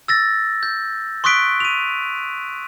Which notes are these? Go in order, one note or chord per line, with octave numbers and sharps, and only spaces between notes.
E6 A6 A#6
G6
C6 C#6 D#6 F#6 B6 D7
D#7 F7